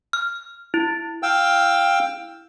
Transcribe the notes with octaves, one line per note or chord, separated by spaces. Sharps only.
F6
E4
F5 G5 E6